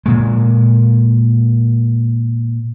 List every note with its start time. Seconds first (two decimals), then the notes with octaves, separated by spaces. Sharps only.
0.06 A#2 G#3